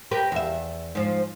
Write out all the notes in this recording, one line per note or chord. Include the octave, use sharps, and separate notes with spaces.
G4 A#4 B4
E2 E5
G#2 F3